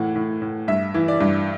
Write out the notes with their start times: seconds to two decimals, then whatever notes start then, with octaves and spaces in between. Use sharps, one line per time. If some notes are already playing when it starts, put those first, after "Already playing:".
Already playing: A2 E3 F#5
0.16 A2
0.42 A2
0.68 G2 E5
0.94 E3
1.08 D5
1.21 G2